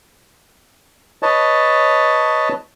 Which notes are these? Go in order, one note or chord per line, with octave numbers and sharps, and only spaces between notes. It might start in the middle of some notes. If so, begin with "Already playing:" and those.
B4 C#5 D#5 A5